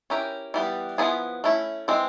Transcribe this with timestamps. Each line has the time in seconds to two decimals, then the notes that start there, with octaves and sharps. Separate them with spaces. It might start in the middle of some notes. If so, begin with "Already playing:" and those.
0.10 C#4 E4 G4 A#4
0.54 E3 G3 B3
0.98 F3 G#3 B3 E4 G#4
1.44 A3 C#4 E4
1.88 E3 G#3 C4